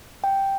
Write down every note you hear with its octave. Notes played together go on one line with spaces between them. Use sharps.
G5